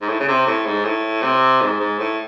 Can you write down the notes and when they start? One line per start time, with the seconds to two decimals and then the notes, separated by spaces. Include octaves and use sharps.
0.02 G#2
0.09 A2
0.20 C#3
0.28 C3
0.47 A2
0.66 G#2
0.85 A2
1.22 C3
1.61 G#2
1.80 G#2
1.99 A2